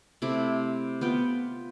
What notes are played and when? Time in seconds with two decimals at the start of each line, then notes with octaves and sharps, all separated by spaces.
0.22 C3 A3 E4 D6
1.01 B3 F4 G5